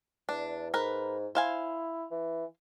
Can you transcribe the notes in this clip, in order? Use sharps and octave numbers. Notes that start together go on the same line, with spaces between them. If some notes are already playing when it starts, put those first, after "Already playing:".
E2 D4
G#2 A#4 B4
E4 C5 F5 G#5
E3